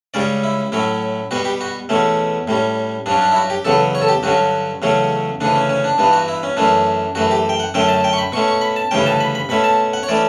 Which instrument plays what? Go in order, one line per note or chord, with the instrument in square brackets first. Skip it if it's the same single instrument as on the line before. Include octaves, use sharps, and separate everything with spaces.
[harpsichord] C#2 C#3 G3 C#4 D5
E4
A2 F#3 C#4 E4
B2 G3 B3 F#4
G4
F#4
E2 B2 A3 C#4
A2 G3 C#4
G2 F#3 C#4 D4
D4
E4
F#4
G4
E2 C#3 F#3 B3 A4
C#5
A4
G4
G2 D3 F#3 C#4 F#4
E2 C#3 F#3 A3 C#4
D2 C#3 E3 D4
C#4
C#4
D4
G2 E3 B3 D4
F#4
E4
C#4
F#2 E3 A3 C#4 D4
F#2 E3 A3 F#4
G4
G5
F#5
F#2 D3 F#3 A3 C#4 G5
A5
G5
C#6
B5
B2 A3 C#4 C#6
C#6
B5
A5
D2 C#3 E3 G3 C#4 G5
A5
B5
B5
B2 A3 C#4 B5
A5
F#5
C#5
E3 A3 C#4 D5